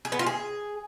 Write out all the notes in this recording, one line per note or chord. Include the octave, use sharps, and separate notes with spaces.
G#4
B3
F4
G#4